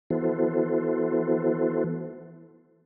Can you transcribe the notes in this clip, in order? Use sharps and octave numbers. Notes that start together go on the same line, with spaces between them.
E3 B3 E4 F#4 A4 C5